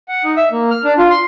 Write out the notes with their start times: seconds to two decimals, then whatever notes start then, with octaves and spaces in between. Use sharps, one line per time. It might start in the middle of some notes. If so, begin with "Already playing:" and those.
0.08 F#5
0.24 D#4
0.37 E5
0.52 A#3
0.70 F6
0.84 D4
0.98 F4
1.10 C6